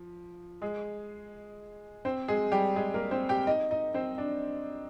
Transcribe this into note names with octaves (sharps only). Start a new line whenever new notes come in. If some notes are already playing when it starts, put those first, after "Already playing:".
Already playing: F3
G#3 G#4
C4 C5
G#3 G#4
G3 G4
G#3 G#4
A#3 A#4
C4 C5
G4 G5
D#4 D#5
D#4 D#5
C4 C5
D4